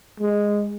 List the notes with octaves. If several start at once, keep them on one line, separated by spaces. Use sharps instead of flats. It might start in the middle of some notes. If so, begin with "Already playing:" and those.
G#3